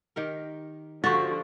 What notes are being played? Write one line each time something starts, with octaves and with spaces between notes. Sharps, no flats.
D#3 G4 A#4
D3 F3 F#4 G4 C5 D5 C#6 A6